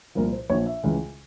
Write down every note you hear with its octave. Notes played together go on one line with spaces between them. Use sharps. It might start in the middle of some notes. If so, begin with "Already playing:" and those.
C2 A#2 F3 A#4
C5
A#1 A#2 F3 C#5
E5
C#2 C#3 E3